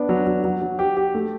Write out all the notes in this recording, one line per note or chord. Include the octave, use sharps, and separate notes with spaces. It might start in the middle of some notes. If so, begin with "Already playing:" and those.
Already playing: B3 D4
F#3
F#3
F#3
F#3
G4
G4
A3